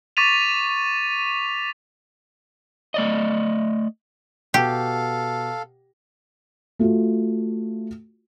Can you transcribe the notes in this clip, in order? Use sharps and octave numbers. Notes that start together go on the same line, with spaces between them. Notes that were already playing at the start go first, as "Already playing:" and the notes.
C#6 D6 A6 B6 D#7 F7
A3 D5 D#5
B2 G4 A4 F5
A3 F4 F#4